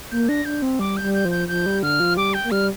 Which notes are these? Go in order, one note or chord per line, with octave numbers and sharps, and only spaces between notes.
A#3 G6
D4 A#6
D4 G6
C4
G3 D6
G6
G3
G6
F3
G6
F3 G6
G3
D3 F6
F3
G3 D6
G5
A#3
G3 F6